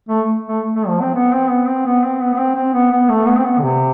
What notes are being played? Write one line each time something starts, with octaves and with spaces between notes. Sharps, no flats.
A3
A3
A3
F3
C4
B3
C4
B3
C4
B3
C4
B3
B3
C4
C4
B3
B3
A3
B3
C4
B3
D3
C3